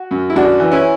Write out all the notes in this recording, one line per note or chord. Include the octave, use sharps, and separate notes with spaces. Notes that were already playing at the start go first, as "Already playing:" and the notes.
Already playing: F#4
F#2
E4
F#2 D4 F#4
E3
C#4 E4